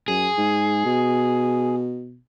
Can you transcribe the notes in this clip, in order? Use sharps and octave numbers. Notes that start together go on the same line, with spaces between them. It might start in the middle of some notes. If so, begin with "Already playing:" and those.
F#2 G#4
G#2
B2